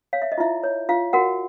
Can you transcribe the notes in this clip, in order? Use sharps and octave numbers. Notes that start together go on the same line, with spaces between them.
C#5 F5
E5
D#5
E4 F4 E5
C#5
F4 F5
F#4 A#4 F#5